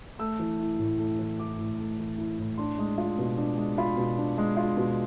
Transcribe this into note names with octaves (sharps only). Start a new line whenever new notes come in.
A3 E6
E3
E4
A2
A3
E3
E4 D6
A2
A3
E3
E4
A2
D4 C6
G#3
F4
B2
D4
G#3
F4 B5
B2
D4
G#3
F4
B2